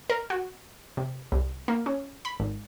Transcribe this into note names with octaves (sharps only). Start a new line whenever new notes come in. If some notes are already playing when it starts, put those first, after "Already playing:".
A#4
F#4
C3
C2
A#3
C#4
B5
G#1